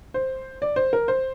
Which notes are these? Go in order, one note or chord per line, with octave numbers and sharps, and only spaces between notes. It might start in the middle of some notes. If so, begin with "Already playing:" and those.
C5
D5
C5
A#4
C5